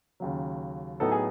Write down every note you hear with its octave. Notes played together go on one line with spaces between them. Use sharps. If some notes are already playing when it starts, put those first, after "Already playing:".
D#2 C#3 F#3
A2 F#3 B3 D#4 A4
G#4